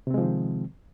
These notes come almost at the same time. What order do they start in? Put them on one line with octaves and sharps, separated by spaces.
C3 C4 G#3 F3 D#3